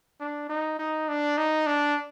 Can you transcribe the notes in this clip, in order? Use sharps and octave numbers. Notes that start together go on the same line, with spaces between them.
D4
D#4
D#4
D4
D#4
D4